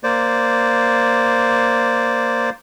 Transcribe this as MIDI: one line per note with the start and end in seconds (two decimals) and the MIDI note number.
0.04 2.50 58
0.04 2.50 72
0.04 2.50 74